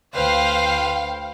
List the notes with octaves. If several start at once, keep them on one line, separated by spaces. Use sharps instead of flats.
D2 B4 C5 F5 G5